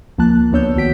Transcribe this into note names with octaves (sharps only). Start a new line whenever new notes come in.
C#2 F3 A#3 A5 F#6
D2 B3 D4 C#5 E6 G6
C2 D#3 F#4 B6 D7